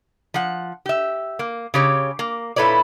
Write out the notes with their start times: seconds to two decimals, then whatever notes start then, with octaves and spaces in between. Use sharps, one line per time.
0.34 F3 F#5
0.86 G4 E5
1.39 A#3
1.74 C#3 G4 C#5
2.19 A#3
2.56 A#2 E4 A4 B4 C#5 D5